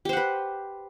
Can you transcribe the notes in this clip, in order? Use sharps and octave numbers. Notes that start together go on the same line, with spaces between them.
G4 B4 C5 F#5